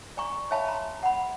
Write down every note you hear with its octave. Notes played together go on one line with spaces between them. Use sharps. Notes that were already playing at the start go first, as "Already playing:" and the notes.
D5 G#5 A#5 C#6
C#5 E5 F5 G#5 A5 B5
A#5 C6
F#5 B5